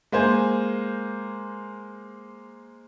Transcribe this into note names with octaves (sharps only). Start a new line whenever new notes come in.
G#3 A#3 C5 G#5